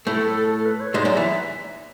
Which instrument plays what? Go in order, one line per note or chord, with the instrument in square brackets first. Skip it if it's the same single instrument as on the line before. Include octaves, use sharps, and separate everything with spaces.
[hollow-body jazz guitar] A2 A3 [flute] A4
[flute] A4
A4
B4
C#5
[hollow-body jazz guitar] G#2 G#3 [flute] D5
[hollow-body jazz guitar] F#2 F#3
[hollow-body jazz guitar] E3 [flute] E5